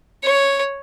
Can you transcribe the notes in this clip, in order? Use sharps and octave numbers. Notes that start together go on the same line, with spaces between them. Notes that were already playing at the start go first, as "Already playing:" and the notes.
C#5